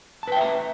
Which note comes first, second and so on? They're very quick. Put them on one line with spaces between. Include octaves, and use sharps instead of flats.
A5 B4 G5 E5 A#5